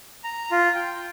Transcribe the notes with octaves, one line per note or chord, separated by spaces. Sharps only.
A#5
F4
G5